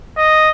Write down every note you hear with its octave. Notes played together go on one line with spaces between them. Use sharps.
D#5